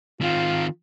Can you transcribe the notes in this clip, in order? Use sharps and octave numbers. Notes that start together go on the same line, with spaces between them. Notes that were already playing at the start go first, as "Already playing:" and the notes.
D#3 C4 F4